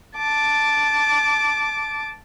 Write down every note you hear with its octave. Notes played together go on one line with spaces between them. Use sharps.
A5 D6